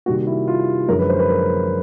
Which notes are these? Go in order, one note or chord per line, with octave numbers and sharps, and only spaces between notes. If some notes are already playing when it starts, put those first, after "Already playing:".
C3 D#3 G3 A#3 F#4
E4
F4
F#2 D3 F3 G#3 A#4
B4
C5
B4
A#4